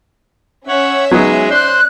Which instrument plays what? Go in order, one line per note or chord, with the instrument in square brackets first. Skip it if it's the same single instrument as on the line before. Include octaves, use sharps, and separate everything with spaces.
[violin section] C#4 E5 [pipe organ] C#5 F#5
[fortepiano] F#3 B3 D#4 [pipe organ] G#3 G#4
[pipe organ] C5 C6 [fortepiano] D5 [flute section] F#6